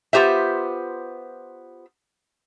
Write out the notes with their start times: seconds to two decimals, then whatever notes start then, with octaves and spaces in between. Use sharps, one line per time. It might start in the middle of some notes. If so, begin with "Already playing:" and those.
0.13 B3 F4 G4 C5 E5